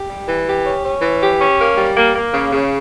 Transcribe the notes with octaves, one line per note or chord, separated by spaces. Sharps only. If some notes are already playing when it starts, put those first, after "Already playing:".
Already playing: G4
G3
E3
G4
C#4
C#4
E3
G4
C#4
A#3
G3
A#3
A#3
C#3
C#3